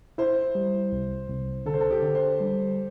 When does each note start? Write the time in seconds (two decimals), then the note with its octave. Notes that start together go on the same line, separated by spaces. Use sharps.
0.18 E4 C5
0.55 G3
0.92 C2
1.29 C2
1.66 D3 A4
1.74 C5
1.80 A4
1.91 G4
2.03 D3
2.15 C5
2.40 G3